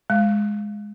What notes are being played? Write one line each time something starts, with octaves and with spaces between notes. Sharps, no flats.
G#3